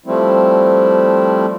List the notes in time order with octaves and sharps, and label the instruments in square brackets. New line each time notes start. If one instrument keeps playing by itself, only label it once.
[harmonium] F3 G3 A3 C4 E4